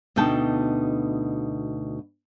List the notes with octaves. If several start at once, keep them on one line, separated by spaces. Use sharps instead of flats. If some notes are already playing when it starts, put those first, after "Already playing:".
D2 B2 D#4 G5 A5